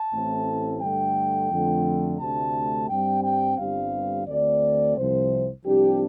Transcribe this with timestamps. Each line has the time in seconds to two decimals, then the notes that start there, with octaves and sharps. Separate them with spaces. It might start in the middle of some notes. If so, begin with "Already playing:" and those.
Already playing: A5
0.13 A1 A2 A3 C4
0.81 G2 D3 A3 G5
1.51 F2 D3 A3
2.20 D2 C3 A3 D4 A5
2.89 G2 G3 C4 G5
3.24 G5
3.58 G1 G2 G3 C4 F5
4.27 D2 D3 A3 C4 D5
4.96 C2 C3 F3 C5
5.65 C2 C3 F3 D4 G4